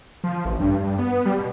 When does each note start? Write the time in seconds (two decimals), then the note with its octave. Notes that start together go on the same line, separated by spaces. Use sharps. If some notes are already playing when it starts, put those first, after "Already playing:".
0.24 F3
0.45 A1
0.60 G2
0.83 G2
0.98 B3
1.26 G3
1.38 B2